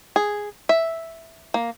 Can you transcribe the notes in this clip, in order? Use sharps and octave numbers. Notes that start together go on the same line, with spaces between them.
G#4
E5
A#3